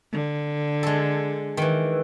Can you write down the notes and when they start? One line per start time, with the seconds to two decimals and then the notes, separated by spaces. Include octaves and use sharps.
0.12 D3
0.83 G#3 A4
1.57 D#3 E3